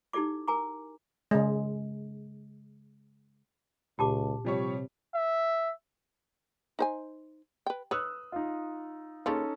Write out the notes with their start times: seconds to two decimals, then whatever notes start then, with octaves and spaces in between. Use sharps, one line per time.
0.13 D#4 E4 G4 A4 D5 D6
0.48 A#4 G#5 A#5 D6
1.31 C#3 G#3
3.99 C#2 A#2 G4 A5 D6
4.45 C3 F3 G3 C#5
5.15 E5
6.79 D#4 C5 G#5
7.66 B4 G5
7.91 B4 C#5 D#6 E6 F#6
8.32 D#4 F4
9.26 C#3 A#3 C#4 D#4 F4 A4